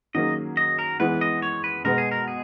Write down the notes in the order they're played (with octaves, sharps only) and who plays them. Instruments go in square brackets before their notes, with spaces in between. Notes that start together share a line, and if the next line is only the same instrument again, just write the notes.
[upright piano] D#3 F#3 A#3 C#4 G#4 [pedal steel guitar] D#5
[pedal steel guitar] D#5
A#4
[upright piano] E3 G#3 B3 [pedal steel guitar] B4
[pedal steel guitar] D#5
C#5
B4
[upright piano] B2 G#3 B3 [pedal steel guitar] A#4
[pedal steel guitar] G#4
A#4
G#4